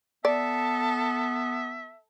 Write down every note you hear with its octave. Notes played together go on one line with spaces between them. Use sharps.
B3 A4 D5 E5